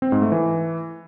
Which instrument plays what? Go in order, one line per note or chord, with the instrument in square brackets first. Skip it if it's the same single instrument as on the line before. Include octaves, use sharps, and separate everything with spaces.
[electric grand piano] C4
G#2
A3
E3